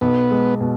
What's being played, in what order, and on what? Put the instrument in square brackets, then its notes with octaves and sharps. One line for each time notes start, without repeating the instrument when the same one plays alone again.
[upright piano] B1 [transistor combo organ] B3
[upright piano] G#3
B2